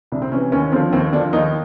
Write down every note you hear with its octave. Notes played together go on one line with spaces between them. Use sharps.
C2 D4
C4
C3 E3 C#4
D#2 C#4
D3 F3 C4
D#2 C4
D3 F3 D4
D#2 D#4